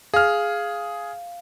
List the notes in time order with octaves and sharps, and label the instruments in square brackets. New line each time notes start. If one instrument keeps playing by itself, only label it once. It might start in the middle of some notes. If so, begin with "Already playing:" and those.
[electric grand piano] G#4 F6 [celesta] F5